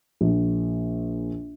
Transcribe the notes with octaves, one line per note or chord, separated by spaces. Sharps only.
A#1